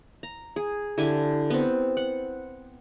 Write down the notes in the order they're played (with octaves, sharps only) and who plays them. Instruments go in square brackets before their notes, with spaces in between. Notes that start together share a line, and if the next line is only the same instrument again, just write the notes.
[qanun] A#5
G#4
D3 E4 G4 G#5
B3 C4
F#5